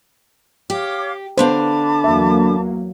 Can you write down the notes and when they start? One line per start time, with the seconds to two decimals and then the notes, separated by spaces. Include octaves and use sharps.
0.70 G4 C#5 F5 D6
1.38 D3 B3 D4 C5 F5 A5 B5 D6
2.04 E2 F#3 A#3 E5